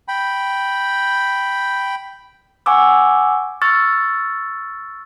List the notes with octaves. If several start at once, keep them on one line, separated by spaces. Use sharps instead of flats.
G5 B5
F#5 G#5 C#6 D6 E6
C#6 E6 F6 A6